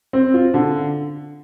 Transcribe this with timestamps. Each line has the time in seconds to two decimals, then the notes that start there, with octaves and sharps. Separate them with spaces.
0.13 C4
0.34 F4
0.54 D3